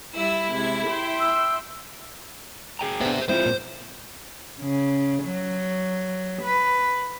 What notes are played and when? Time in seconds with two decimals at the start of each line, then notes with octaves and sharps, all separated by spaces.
0.16 G3 E4 E6
0.50 C3 G#3 G#6
0.89 E5 G5 C6
1.20 E6
2.79 G#4 G5 A#5
3.01 B3 D4 C5 E5
3.29 G#3 C4 E4 F4 C5
3.45 A#2
4.61 C#3
5.24 F#3
6.42 B4